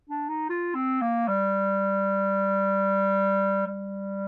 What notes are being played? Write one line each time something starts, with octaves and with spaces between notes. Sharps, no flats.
D4
D#4
F4
C4
A#3
G3
G3